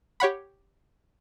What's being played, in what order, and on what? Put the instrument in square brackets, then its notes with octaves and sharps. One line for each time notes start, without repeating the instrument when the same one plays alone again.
[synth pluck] G4 C#5 F#5 B5